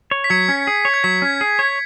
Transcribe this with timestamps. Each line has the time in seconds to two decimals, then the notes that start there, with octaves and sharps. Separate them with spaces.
0.11 C#5
0.24 B6
0.30 F#3 G#6 C#7
0.49 C#4
0.67 G#4
0.85 C#5
0.94 G#6
1.04 F#3 B6
1.22 C#4
1.41 G#4
1.59 C#5